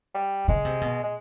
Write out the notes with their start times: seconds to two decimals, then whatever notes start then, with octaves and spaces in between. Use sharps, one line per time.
0.15 G3
0.48 C#3 G#3
0.65 C3
0.81 B2
1.04 G#3